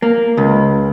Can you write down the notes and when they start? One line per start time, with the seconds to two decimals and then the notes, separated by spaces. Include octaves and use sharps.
0.02 A#3
0.37 C#2